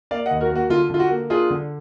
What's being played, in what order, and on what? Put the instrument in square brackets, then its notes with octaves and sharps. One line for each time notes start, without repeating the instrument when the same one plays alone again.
[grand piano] A#3 D5 F5
D#5 F#5
D#2
F#4 A#4
A#3 F#4
D3 F4
D3 F4
F#4
A#3
D4 F4 G#4
D3